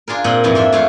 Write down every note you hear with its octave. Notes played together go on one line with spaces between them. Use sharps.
D4 F4 G#4 A#4
A#2 C4 D#5 F#5
F2 G#2 E3
A#3 D4 E5
F2 A3 F4